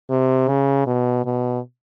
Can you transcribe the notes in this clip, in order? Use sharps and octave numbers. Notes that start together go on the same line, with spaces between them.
C3
C#3
B2
B2